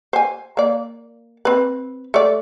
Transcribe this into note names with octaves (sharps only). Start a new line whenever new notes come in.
C5 G#5
A#3 D5
C4 B4
A3 D5